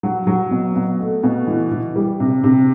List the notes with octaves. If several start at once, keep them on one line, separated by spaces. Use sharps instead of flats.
F#3
F#3
B2
B2
A3
B2
E3
E3
G3
C3
C3